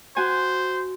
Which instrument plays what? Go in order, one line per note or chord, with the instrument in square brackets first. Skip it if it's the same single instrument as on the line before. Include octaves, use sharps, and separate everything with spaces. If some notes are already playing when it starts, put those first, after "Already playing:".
[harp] F#4 G#5 [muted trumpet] C5